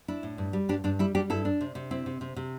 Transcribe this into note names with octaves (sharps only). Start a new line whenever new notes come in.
D4 E4
A2
G2
G3
G2 D4 G4
G2 D4
G3 E4
G3 D4 G4
G2 E4 A4
D4
C3
C3
C4 E4
C3
C3
C3